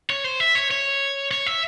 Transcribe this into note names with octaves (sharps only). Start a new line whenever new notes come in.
C#5
C5
E5
C#5
C#5
C#5
E5